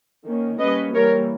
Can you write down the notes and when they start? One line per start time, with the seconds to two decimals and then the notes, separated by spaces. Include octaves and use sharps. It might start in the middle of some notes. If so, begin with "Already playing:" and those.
0.26 D#3 A#3 C#4
0.59 G3 A#3 C#4 B4 D#5
0.94 E3 G3 A#3 A#4 C#5